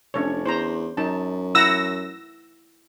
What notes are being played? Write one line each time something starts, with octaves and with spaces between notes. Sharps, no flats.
F1 C#4 D4 C#5
E2 C5 A#5
F#2 D#4 A5
E4 F#5 A#5 E6 A#6